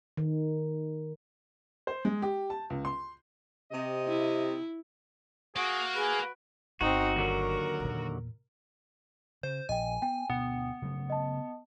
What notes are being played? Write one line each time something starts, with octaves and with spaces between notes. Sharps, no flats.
D#3
C5
G#3
G4
A5
C#2
C6
C3 D#5
E4
A#3 F#4 G#4
G#4 B4
G1 C4 D#4 F#4
D#2 D3 F#3 A#4
E2 A#2
C#3 C5
A#1 D#5 G5 G#5
B3 G5
D2 B2 B3
C#3 F#3 A3
D#5 A5